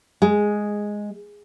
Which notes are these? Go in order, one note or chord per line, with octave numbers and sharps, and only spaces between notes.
G#3